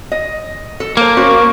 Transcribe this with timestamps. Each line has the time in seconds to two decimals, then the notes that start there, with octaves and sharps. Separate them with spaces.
0.12 D#5
0.80 A4
0.97 A#3 C5 A5
1.17 C#4 F#4 C5